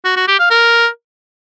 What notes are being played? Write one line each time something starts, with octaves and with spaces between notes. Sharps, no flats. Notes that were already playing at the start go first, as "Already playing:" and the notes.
F#4
F#4
G4
F5
A#4